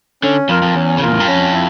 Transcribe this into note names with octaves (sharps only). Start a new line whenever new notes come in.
D3 C#4
F2 F4 A#4
F2
E2 C#4
C#3
A#2 F4 A#4
A2
G2
F2 C#4
E4